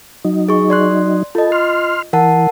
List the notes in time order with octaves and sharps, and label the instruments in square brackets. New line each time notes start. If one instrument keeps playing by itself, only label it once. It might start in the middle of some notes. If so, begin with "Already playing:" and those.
[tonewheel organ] F#3 D#4
[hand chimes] G#4 C#6
D5 C6 F#6
[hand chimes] F4 D#5 [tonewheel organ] A4
[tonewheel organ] C6 F6
[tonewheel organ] E3 [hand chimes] A#4 F#5 A5